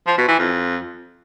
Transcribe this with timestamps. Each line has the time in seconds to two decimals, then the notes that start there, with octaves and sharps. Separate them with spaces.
0.07 F3
0.18 B2
0.28 E3
0.39 F2